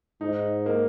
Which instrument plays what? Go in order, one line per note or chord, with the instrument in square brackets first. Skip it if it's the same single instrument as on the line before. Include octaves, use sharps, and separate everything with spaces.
[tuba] G#2 [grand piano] D#4
[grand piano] A#3